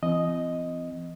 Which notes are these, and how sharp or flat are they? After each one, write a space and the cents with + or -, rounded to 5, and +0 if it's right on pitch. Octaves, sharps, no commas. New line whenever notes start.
E3 +40 C4 -35 D#5 +0